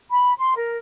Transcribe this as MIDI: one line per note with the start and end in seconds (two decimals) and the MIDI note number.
0.10 0.33 83
0.38 0.54 84
0.56 0.77 70